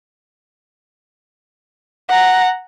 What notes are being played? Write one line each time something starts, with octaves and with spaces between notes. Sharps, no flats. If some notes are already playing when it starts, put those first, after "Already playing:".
F#5 A#5